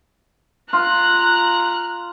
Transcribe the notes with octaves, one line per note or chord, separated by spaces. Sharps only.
F4 A#5 F#6